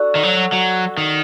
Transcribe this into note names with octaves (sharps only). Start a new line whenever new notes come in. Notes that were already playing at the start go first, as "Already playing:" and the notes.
Already playing: D4 F#4 A4
D#3
F#3
F#3
D#3